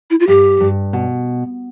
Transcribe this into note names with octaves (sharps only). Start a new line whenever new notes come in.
E4
F4
G2 G4
G2
B2